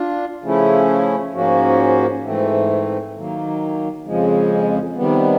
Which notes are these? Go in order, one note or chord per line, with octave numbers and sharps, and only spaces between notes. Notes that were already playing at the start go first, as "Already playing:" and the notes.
Already playing: D4 F4
C#3 F3 A3 C#4 E4
G#2 F3 A#3 C#4 F#4
G#2 E3 A3 C4
D#3 F#3 A#3
F2 C#3 F3 G#3
C3 D#3 G3 B3